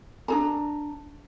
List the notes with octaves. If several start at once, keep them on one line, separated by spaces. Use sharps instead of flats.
D4 G#4 A#5